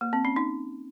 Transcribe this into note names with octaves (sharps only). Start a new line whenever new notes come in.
A#3
C4
C#4
D#4